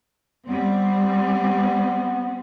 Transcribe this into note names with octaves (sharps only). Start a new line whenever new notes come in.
G3 B3 C4